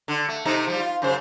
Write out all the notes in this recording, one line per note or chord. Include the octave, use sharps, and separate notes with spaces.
D3
A3
C3 A3 D#4
F3 G3
F4
F#2 C#3 C5